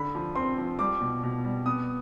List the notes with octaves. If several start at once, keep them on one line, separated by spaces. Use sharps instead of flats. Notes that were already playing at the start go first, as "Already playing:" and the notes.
Already playing: D3 B5
F3
C4 C6
F3
G3 D6
B2
B2
G3
B3 D#6